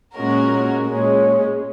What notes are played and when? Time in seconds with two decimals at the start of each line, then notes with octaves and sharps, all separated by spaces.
0.15 A#2 G#3 C#4 F#4 A#4
0.87 A#2 G#3 C#4